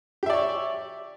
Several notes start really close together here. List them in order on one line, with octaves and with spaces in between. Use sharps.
G4 E5 D5 C#5